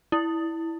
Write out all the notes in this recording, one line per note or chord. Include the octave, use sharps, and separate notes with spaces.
E4